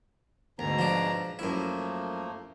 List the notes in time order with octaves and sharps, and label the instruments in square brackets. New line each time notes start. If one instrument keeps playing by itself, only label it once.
[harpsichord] D2 [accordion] G#2 B2 A#5
[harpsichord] F3 D4
[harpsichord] F#2 E4 [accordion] F3 A3 A#3